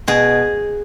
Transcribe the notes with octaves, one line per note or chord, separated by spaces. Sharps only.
B2 G#4